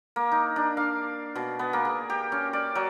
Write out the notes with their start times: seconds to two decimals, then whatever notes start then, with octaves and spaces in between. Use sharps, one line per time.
0.16 A#3
0.32 D#4
0.56 D4
0.77 F5
1.35 B2
1.59 B3
1.73 A#3
1.85 G#4
2.10 G4
2.32 C#4
2.53 D5
2.75 F#3